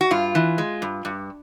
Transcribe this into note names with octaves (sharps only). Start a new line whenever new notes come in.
F#4
G2 F4
E3
G#3
G2
G2